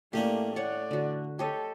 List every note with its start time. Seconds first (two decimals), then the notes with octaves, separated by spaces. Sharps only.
0.13 A2 A3 A#3 C#4 D4 G4
0.56 C#5 D5 F#5
0.91 D3 F#4
1.39 G4 A4 C#5 D#5